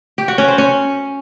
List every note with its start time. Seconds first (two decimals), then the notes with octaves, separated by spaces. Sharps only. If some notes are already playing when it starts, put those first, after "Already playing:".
0.18 G4
0.28 F#4
0.38 C#4
0.48 C5
0.58 C#4